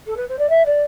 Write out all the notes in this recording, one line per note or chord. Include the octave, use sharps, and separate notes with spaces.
A4
B4
C5
D5
E5
D5